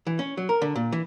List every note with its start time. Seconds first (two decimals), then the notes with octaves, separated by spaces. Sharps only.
0.07 E3
0.19 C#4
0.37 F#3
0.49 A#4
0.62 D3
0.75 A#2
0.92 E3